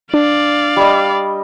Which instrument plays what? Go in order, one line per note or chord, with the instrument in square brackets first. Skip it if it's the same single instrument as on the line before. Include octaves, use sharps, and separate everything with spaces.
[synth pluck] D4 [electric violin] D5 F5
[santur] G3 D#5